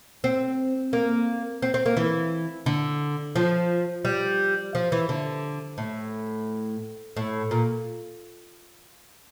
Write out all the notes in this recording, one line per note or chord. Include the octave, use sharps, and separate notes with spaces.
C4
A#3
C4
C4
A#3
E3
D3
F3
G3
F3
E3
D3
A2
A2
A#2